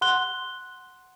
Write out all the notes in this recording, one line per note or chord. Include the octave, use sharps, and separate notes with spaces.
F#5 C6 F#6 G7